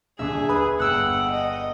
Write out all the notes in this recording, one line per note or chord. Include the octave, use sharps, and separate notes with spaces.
D#1 D3 G#4 E5
B4 B5 D#6
G1 F#5 G5 E6 F#6
D#5